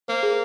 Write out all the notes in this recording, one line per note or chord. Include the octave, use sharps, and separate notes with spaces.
A#3 C5
G#4